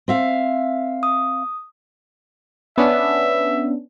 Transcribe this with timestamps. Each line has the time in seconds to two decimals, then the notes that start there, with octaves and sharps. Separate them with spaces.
0.08 C4 E5 F5
1.03 D#6
2.78 B3 C#4 D4 E5